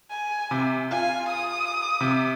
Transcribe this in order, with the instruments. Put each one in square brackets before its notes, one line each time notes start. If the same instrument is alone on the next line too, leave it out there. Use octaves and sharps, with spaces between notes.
[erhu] G#5
[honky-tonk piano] C3
[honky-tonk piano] F4 [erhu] G#5
[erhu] D#6
[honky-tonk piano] C3